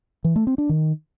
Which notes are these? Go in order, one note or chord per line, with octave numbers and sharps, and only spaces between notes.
E3
A3
C4
D4
D#3